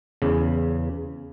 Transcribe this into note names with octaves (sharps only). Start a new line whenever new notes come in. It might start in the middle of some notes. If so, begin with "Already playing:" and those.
E2 C#3